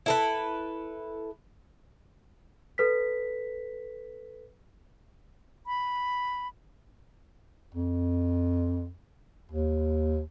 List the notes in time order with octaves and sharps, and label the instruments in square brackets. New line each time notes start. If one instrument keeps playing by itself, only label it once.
[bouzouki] E4 A4 B4
[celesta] A4 B4 B6
[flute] B5
[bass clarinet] F2
D#2